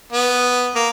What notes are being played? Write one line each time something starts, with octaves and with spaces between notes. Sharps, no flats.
B3
A#3